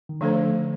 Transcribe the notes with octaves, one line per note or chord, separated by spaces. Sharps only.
D#3
D3 F3 A3 D4 A4 C5